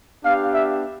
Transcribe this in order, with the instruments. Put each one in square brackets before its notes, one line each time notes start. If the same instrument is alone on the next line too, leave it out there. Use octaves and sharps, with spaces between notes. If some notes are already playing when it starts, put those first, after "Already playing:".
[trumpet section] B3 D4 G4 F5
E5